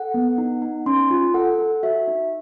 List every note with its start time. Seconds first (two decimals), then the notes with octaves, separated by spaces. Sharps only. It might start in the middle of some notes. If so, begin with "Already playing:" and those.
Already playing: A4 F#5
0.14 B3
0.38 D#4
0.62 D#4
0.86 C#4 C6
1.11 F4
1.34 A4 F#5
1.59 A4
1.83 F#4 E5
2.07 D#4